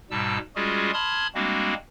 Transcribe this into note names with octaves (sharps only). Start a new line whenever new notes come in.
G#2 B2 G3 A5 E6
G3 G#3 C#4 F4 F#4 G#4
A5 B5 C6 D#6 F6 G#6
G3 G#3 A#3 C4 D4 F#4